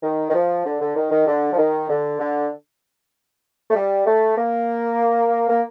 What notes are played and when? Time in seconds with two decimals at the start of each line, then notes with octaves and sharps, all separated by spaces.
0.03 D#3
0.29 D#3
0.34 F3
0.65 D3
0.81 D3
0.96 D#3
1.11 D#3
1.27 D3
1.53 F3
1.58 D#3
1.90 D3
2.19 D3
3.70 A3
3.75 G3
4.07 A3
4.37 A#3
5.50 A#3